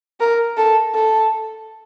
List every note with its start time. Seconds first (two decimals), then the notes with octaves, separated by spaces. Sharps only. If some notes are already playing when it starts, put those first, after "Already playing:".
0.20 A#4
0.57 A4
0.95 A4